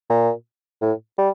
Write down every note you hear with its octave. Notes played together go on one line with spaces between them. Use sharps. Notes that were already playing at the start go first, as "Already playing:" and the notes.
A#2
A2
G3